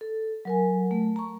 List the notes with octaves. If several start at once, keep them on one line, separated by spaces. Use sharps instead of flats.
A4
F#3 A#4 G#5
A3
A#5 C#6